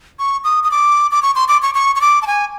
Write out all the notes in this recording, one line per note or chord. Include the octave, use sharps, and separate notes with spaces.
C#6
D#6
D#6
D6
D6
C#6
C6
D6
C#6
C#6
C#6
D6
A5
G#5